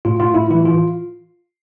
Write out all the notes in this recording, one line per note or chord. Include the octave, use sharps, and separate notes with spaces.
A2 F4
A2 F4
A2 E4
E3 E4
E3 F4